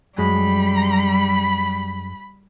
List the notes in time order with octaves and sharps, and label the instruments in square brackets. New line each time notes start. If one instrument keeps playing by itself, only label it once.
[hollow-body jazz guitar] F#2 G#3 [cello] G3 [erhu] B5